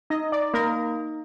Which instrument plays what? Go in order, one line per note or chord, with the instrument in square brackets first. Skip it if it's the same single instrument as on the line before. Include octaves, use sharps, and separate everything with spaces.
[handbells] D#4 [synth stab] D#5
[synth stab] D5
[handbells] A#3 [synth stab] A#4